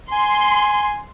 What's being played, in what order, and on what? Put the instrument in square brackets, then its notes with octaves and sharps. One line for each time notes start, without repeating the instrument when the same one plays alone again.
[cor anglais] G#5 [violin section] C6